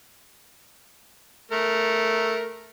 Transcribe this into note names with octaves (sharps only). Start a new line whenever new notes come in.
A3 A#4